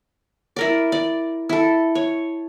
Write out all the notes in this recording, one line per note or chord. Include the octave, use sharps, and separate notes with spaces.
E4 A#4 D5
D5
E4 A4
C#5